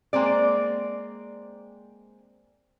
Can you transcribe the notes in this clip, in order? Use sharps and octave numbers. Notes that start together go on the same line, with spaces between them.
G#3 A#3 C4 D5